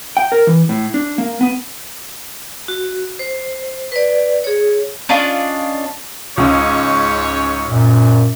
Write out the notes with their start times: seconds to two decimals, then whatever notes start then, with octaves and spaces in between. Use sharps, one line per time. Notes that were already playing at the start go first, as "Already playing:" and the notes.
0.17 G5
0.32 A#4
0.47 E3
0.69 A2
0.94 D4
1.18 A#3
1.41 B3
2.68 F#4
3.19 C5
3.92 B4 D5
4.44 G#4 C#5
5.09 C#4 D4 F4 D#5
6.37 C#2 G#2 C#4 C#5
7.68 F#2 A#2